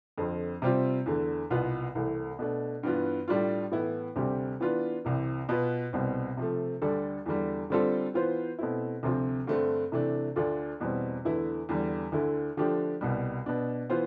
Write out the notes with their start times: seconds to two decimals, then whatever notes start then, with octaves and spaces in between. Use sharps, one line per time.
0.18 F2 D3 F3 C4
0.62 C3 G3 C4 F4
1.06 E2 D3 A3
1.50 C2 B2 B3 F4 B4
1.95 C2 C3 E3 A3
2.39 B2 A3 D4
2.83 G2 E3 B3 F4
3.28 A2 G3 D4 F4
3.71 A2 E3 B3 E4
4.16 D2 C3 G3 C4 G4
4.60 E3 B3 D4 F4 B4
5.05 C2 C3 E3
5.49 B2 B3 F4 B4
5.93 C2 B2 G3 C4
6.37 C3 F3 A3
6.82 D2 D3 G3 D4 A4
7.26 E2 D3 G3
7.70 D3 G3 C4 F4 A4
8.14 E3 B3 F4 C5
8.59 B2 A3 C4 E4
9.03 D2 C3 F3 C4 F4
9.47 G2 D3 A3 C4
9.92 C3 E3 A3 D4
10.36 D2 D3 A3 D4 F4
10.80 E2 B2 G3 C4
11.25 E2 D3 A3 E4 B4
11.69 E2 D3 G3
12.12 D2 D3 A3 E4
12.57 D3 F3 A3 D4 G4
13.01 C2 B2 G3
13.46 B2 B3 D4
13.89 E3 B3 F4 C5